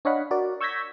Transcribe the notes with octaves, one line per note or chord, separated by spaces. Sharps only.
D4 C#5 D#5 F5 F#5 B5
F#4 A#4 D5
C#6 E6 G6 G#6 A#6 B6